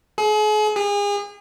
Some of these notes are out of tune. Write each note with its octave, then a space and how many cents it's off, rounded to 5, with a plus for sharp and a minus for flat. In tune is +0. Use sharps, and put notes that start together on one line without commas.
G#4 +40
G#4 -35